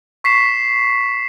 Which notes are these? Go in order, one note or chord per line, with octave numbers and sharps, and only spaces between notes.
C#6 B6 C7 E7